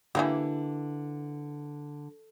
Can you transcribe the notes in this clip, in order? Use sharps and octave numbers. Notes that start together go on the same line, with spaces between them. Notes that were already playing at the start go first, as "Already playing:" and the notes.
D3 E3 A#3 G4